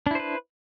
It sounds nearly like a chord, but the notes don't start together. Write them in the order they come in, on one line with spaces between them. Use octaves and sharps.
D4 E4 C5 B4